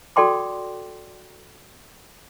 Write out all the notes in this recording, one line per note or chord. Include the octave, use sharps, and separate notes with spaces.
F#4 A4 D5 G5 C6 D6